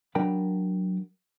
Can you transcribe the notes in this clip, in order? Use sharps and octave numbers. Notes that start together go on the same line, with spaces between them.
F#3 D4 A#4 G5 A5 B5